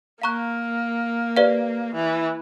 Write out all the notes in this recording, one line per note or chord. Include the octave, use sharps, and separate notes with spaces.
A#3 F5 A#5 C#6 F#6
G4 B4 D5 F5
E3